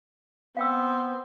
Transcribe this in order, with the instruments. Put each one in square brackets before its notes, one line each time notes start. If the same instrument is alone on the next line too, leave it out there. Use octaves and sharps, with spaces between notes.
[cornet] B3 [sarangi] C4 [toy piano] F5 G5 E6